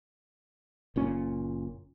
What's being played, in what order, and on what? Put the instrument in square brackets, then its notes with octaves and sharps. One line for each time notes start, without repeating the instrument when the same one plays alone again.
[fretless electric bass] F#1 A#2 C#4